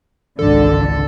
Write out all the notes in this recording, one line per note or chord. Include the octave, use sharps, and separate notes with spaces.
G#1 C#2 D3 A4